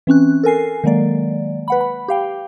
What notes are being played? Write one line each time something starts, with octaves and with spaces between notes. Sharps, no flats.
E3 C4 C#4 F#6
A4 A#4 G#5 C7
D#3 F#3 G#3 A#3 D5
B4 F#5 B5
B5
G4 F5 G5